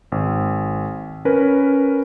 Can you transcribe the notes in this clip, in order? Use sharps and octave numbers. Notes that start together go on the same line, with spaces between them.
G#1
C#4 A#4 B4